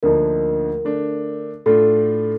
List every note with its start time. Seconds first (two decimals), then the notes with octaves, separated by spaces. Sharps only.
0.03 D2 D3 F3 A#3 D#4 A#4
0.85 D3 A3 D4
1.66 A2 A3 D4 F4 A4